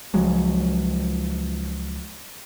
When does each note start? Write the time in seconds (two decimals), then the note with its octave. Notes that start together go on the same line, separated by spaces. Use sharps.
0.14 C#2 F3 F#3 G#3